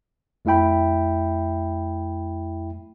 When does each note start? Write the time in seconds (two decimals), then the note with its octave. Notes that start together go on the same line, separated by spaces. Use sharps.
0.45 F2 A3 E4 E5 G5 B5